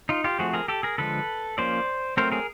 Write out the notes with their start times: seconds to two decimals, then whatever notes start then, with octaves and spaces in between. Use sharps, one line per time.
0.09 D#4 F4
0.24 F4 G4
0.39 F3 A3 C4 F#4 G#4
0.53 G#4 A#4
0.68 G4 A4
0.83 G#4 A#4
0.98 D3 F3 G#3 A4 B4
1.58 F3 A#3 C#4 C5 D5
2.17 F#3 A3 C4 A#4 C5
2.32 G#4 A#4